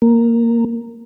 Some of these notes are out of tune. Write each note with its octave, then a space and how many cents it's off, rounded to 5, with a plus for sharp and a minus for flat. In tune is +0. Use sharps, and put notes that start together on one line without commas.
A#3 -5